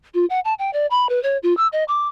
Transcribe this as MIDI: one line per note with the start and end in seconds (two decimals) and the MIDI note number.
0.14 0.25 65
0.30 0.40 78
0.45 0.54 81
0.59 0.70 79
0.73 0.86 74
0.91 1.07 83
1.09 1.21 71
1.23 1.37 73
1.43 1.55 65
1.57 1.68 88
1.72 1.84 75
1.88 2.08 86